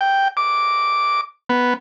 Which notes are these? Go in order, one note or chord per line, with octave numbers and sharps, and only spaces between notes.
G5
D6
B3